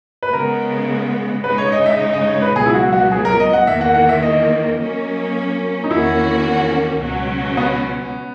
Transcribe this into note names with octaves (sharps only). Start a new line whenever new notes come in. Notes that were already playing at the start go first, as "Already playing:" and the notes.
B4
C#3 G#3 B3 A#4
C#3 G#3 D#4 B4
C#5
D#5
E5
D#5
D#5
C#5
B4
C#2 B2 F#3 B3 G#4
E4
F#4
F#4
G#4
A#4
D#5
F#5
E2 D#3 A#3 E5
F#5
F#5
E5
D#5
F#3 A#3 C#4
D#4
E2 D#3 A#3 C#4 E4 F#4
C#2 B2 F#3 C#4
B3